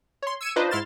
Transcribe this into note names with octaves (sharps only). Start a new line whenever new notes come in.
C#5 C6
E6 G#6 C#7 D#7 E7
D4 D#4 F4 B4 C5 D#5
G#2 E4 C6 F6 A6 E7